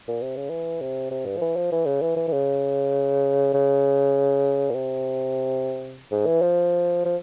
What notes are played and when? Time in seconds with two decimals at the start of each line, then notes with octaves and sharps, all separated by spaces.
0.08 A#2
0.22 C3
0.36 C#3
0.50 E3
0.81 C3
1.11 C3
1.25 G2
1.37 F3
1.41 E3
1.56 F3
1.72 E3
1.86 C#3
2.02 E3
2.16 E3
2.28 E3
2.33 C#3
3.53 C#3
4.70 A#2
4.74 C3
6.11 G#2
6.26 E3
6.42 F3
7.05 F3